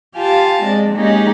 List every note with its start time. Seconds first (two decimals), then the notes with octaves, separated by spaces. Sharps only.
0.16 F4 G4 F5 G#5 A5
0.63 G#3 C4 D4
0.94 G#3 A#3 C#4 D#4 G4 G#4